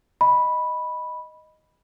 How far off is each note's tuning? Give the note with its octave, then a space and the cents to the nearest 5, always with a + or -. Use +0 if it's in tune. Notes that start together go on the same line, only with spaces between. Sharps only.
D#5 +0 B5 -5